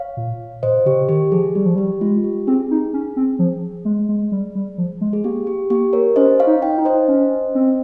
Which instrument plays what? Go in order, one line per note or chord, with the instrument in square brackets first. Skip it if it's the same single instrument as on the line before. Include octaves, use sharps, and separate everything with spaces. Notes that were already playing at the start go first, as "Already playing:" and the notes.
Already playing: [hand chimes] C#5 F5
[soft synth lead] A#2
[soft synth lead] A#2 [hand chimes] C5 D#5
[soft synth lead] C#3 [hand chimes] G4
[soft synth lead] D#3 [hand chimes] G4
[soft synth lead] F3 [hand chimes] G#4
[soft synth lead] G3 [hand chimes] G4
[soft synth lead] F3
[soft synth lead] G3 [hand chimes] G4
[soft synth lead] G#3 [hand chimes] F4
[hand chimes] G4
[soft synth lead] C4 [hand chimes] G#4
[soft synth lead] D#4
C#4
C4
F3
G#3
G#3
G3
G3
F3
G#3
[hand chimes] G#4
[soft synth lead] A#3 [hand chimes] G4
[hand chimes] G4
[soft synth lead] A#3 [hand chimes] G4
[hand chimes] A#4 C#5
[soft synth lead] C#4 [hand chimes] C5 D#5
[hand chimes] C#5 F5
[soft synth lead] D#4
[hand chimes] D#5 G5
[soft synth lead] D#4
[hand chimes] C5 D#5
[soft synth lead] C#4
C4